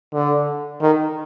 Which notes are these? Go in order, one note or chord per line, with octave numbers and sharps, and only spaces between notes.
D3
D#3